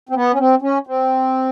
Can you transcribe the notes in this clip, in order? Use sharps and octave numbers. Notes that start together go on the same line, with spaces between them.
C4
B3
C#4
C4
C#4
C4